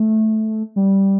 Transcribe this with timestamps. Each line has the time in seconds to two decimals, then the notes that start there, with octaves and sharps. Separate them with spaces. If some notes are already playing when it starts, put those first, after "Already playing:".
Already playing: A3
0.76 G3